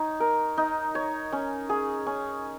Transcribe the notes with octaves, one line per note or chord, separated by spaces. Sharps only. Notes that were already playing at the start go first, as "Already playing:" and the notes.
Already playing: D#4 C#5
A#4
D#4
C#5
C#4
G#4
C#4